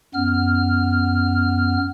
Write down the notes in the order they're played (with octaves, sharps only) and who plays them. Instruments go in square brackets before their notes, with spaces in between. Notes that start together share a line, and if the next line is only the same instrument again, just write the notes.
[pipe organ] F#2 B3 F6